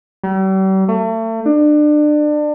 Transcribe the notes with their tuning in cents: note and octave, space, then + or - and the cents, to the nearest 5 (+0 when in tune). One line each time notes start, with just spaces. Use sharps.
G3 -45
A3 +35
D4 +30